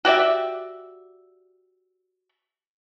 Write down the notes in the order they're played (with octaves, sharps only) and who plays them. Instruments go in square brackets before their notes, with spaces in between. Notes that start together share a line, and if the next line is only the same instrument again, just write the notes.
[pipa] F#4 G4 D5 E5